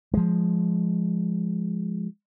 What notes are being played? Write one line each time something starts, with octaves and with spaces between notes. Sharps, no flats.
F3 G#3